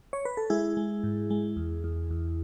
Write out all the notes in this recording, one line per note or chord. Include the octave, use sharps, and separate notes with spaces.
C#5
B4
A4
G#3 E4 G#4
G#3
G#2
G#3
E2
E2
E2